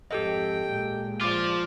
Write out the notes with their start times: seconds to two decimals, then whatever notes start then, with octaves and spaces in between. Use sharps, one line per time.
0.11 F2 G#2 G4 A4 D#5 G5
0.67 A#2 G#3
1.21 F3 F4 D5 D6